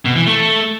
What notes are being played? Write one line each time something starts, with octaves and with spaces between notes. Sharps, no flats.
B2
E3
A3